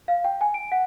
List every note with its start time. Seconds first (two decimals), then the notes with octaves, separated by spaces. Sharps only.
0.08 F5
0.24 G5
0.41 G#5
0.54 D7
0.72 F#5